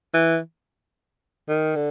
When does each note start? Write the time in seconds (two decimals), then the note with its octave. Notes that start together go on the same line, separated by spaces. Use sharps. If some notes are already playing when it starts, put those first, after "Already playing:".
0.14 E3
1.49 D#3
1.76 D3